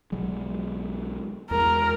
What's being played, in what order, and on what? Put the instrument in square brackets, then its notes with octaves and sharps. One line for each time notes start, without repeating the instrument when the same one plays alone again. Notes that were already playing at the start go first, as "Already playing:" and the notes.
[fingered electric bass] B1 F#3 G#3
[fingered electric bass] E2 G#3 [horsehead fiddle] A#4